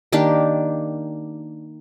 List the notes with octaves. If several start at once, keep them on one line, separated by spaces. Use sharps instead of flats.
D#3 A#3 D4 G4